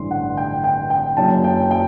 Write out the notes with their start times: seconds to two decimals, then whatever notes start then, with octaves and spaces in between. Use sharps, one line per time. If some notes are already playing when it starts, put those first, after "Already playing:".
Already playing: A1 G2 D3 G3 C6
0.11 F#5
0.37 G5
0.64 G5
0.90 G5
1.17 F#1 F#2 F#3 A5
1.44 G5
1.71 G5